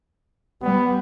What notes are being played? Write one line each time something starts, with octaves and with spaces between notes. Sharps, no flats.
G3 B3